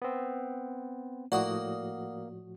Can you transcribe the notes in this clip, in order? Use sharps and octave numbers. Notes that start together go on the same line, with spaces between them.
B3 C4
A2 F3 A#3 F#4 D5 F#5 D#6